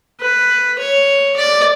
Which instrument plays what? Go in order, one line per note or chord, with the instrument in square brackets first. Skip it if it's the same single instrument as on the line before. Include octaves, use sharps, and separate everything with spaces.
[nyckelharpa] B4
C#5
D5